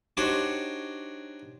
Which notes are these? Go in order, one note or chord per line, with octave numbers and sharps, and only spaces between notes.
D4 D#4 F#4 G4 C5 C#5